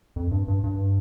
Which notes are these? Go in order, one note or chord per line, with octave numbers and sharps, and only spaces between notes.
F2
G2
G2
G2